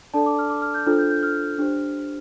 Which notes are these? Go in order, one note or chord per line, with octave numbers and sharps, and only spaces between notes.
D4 A4 D5 A5
D6
F6
D6
F6
G6
D4 F4 A4 C5 F6
G6
G6
F6
D4 G4 C5